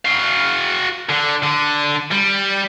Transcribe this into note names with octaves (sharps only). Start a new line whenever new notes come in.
F#4 F5
D3
D3
G3